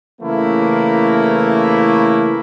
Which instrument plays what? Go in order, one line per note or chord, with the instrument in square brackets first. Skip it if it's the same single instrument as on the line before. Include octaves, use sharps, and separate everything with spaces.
[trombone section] C#3 E3 A3 A#3 E4